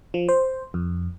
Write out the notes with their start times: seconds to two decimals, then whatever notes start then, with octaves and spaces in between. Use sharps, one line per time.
0.14 F3
0.29 C5
0.74 F2